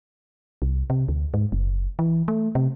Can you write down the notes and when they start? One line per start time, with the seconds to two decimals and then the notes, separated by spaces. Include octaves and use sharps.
0.62 C2
0.90 C3
1.08 D2
1.34 G#2
1.52 F#1
1.99 E3
2.28 A3
2.55 C3